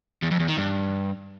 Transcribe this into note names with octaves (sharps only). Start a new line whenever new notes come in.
E2
F2
E2
D#3
G2